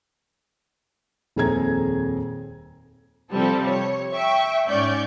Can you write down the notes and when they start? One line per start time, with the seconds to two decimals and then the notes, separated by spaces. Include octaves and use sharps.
1.36 D#1 F2 G#4 A4 A#5 G#6
3.33 C3 F3 G3 C4 A4
3.67 C#5
4.13 E5 G5 C#6
4.68 G#2 C#4 D5 C#6 G6